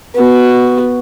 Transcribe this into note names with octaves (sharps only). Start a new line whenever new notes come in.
B3 F#4